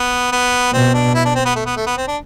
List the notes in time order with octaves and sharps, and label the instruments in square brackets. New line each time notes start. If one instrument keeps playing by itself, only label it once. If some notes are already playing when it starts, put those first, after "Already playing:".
Already playing: [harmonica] B3
B3
[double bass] B2 [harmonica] C4
[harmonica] D4
E4
D4
C4
B3
A3
B3
A3
B3
C4
D4